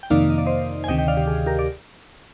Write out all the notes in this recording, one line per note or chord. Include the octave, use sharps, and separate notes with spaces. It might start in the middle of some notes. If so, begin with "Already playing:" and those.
G5
F2 C3 D#3 A#3 D#4 D5 F5
D#5
D5
C5 D#5
G#5
D2 C3 D#3 D#5 G5
D#5 G5
D5 F5
G4
G#4
G4 A#4
D5